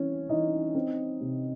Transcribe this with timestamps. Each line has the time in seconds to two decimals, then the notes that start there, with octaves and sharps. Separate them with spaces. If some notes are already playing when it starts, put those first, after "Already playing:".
Already playing: E3 C4 C#4 C#5
0.29 E3 D#4 D#5
0.75 C4
1.20 C3